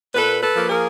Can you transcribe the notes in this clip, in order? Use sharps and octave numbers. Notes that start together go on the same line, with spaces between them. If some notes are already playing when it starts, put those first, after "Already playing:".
A#2 A4 B4
A4 B4
F3 A#3
G#4 A#4